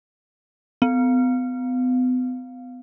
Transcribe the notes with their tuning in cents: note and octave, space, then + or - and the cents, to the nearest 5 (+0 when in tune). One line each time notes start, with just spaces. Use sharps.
B3 +40